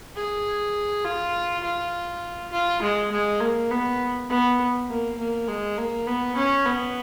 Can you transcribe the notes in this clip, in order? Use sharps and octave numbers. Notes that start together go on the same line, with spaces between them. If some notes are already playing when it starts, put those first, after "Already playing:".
G#4
F4
F4
F4
G#3
G#3
A#3
B3
B3
A#3
A#3
G#3
A#3
B3
C#4
B3